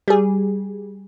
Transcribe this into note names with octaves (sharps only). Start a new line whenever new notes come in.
G3 G#4